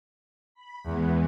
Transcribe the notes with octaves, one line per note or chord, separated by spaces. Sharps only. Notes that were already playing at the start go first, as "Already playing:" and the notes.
B5
E2 E3 G#3 B3